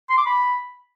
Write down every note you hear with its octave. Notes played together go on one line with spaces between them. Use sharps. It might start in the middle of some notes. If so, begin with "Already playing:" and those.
C6
D6
B5